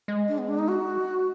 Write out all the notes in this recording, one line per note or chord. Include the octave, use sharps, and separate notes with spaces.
G#3
D4
B3
D4
D#4
F#4